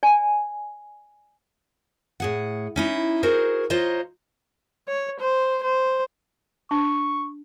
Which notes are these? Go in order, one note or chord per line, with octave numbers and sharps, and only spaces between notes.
D5 G#5
A2 G#4 F#5
C#4 D#4 E4
D#4 F#4 G#4 A#4 C5
F4 C5 C#5 D#5 A#5
C#5
C5
C5
D4 C#6